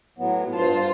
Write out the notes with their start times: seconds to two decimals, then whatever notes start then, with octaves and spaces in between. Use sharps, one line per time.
0.18 A2 F#3 B3
0.53 G2 F4 C5 A5